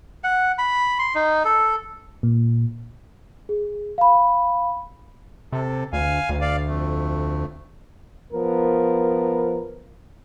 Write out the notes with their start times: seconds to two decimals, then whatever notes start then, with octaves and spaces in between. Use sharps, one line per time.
0.24 F#5
0.58 B5
0.99 C6
1.15 D#4
1.45 A4
2.23 A#2
3.49 G#4
3.98 F5 B5
5.52 C3 A4
5.93 D2 F5 G#5
6.29 D2
6.41 D5 F5
6.66 F2 A3
8.33 F3 B3 A#4